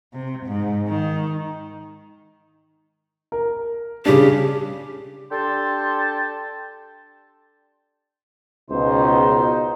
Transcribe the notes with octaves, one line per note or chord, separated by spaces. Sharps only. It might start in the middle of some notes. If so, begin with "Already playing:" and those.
C3
G#2
D#3
A#4
C#3 G3 D4 G4
D4 G4 A4 G5 A5 C6
C#2 B2 D#4 C5